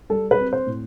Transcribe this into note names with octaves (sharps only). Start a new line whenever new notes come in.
G3 A4
B4
C4
C5
A2